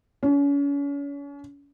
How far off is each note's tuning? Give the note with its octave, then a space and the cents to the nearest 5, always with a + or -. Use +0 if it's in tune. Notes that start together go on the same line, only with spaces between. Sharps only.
C#4 +35